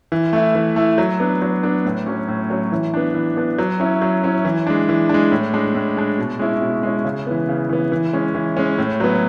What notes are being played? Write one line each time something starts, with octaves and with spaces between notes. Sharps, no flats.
E3
A3 E4
E3
A3 E4
F#3
B3 D4
F#3
B3 D4
A2
F#3 C#4
A2
F#3 C#4
E3
B3 D4
E3
B3 D4
F#3
C#4 E4
F#3
C#4 E4
E3
G#3 D4
E3
G#3 D4
A2
G#3 D4
A2
G#3 D4
B2
G#3 C#4 E4
B2
G#3 C#4 E4
C#3
E3 B3
C#3
E3 B3
E3
G#3 C#4
E3
G#3 C#4
A2
F#3 B3